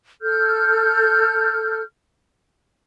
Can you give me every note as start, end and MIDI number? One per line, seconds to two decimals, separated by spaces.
0.22 1.82 69
0.22 1.82 89
0.22 1.82 91